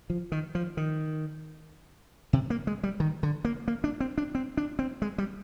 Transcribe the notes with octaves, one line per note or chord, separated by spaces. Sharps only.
F3
D#3
F3
D#3
C3
A#3
G#3
G3
D#3
D3
A#3
A#3
D4
C4
D4
C4
D4
C4
G#3
G3